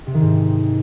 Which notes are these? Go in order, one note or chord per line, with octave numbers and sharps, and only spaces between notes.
C3
D#3
G#2